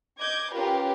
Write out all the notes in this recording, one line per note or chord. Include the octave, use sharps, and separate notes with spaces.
D#5 D6 G6 G#6
C#4 F4 G4 A#4 B4